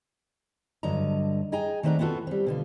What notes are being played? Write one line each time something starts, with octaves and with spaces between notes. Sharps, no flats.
G2 D3 F#3 D#5 A#5
G#4 D#5 G5 G#5 A#5
D#3 A3 C4 D4 F#4 A#5
B3 C4 F4 F#4 A4
G3 C4
B2 D3 F4